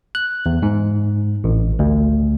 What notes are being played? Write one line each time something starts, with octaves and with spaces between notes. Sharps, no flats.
F#6
E2
G#2
A1
D2